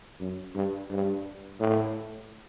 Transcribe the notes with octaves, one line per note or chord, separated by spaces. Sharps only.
F#2
G2
G2
A2